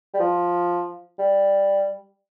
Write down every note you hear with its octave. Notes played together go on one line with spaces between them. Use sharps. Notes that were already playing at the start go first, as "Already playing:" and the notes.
G3
F3
G3